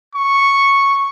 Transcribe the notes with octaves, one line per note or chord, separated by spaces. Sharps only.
C#6